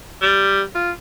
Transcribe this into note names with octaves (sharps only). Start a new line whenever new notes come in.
G3
F4